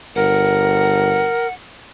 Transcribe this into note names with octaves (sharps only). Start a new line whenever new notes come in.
G1 A#4 F#5